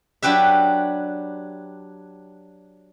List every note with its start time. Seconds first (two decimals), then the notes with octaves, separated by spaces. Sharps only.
0.23 F#3 D4 G4 B4 E5